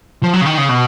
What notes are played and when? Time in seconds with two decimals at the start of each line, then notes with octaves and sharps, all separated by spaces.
0.23 F3
0.34 F#3
0.41 C#3
0.46 D#3
0.58 C#3
0.69 B2